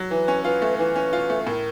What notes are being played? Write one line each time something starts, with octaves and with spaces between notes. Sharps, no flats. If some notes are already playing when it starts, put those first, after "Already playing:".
Already playing: F#3
E3 B4
C#4
F4 B4
A3
E3 B4
C#4
F4
A3
A2 A#4